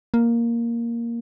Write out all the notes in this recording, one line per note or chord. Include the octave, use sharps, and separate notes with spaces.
A#3